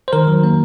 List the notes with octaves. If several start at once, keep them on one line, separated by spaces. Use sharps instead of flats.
C5
D#3 A#4
F#3
A#3